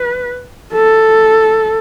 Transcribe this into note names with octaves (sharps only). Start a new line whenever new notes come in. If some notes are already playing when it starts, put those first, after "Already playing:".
Already playing: B4
A4